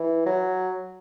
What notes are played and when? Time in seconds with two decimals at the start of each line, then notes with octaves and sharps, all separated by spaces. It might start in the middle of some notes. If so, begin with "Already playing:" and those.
Already playing: E3
0.26 F#3